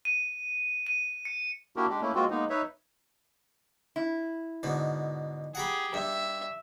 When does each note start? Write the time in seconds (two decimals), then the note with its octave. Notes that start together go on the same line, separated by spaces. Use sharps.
0.05 D#7
0.87 D#7
1.25 C#7
1.76 A#3 D4 E4 F#4 G4 A#4
1.89 G#3 D4 G4
2.01 A3 A#3 C#4 E4
2.15 G#3 A#3 C4 F4 F#4
2.30 G#3 A#3 B3 D#4
2.50 D#4 B4 C#5 E5
3.96 E4
4.63 G#2 B2 D3
5.55 G4 G#4 F#5 A#5 B5
5.94 G2 E5